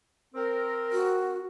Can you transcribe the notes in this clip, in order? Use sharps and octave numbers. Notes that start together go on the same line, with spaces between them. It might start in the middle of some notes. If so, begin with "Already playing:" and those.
C4 A#4
F#4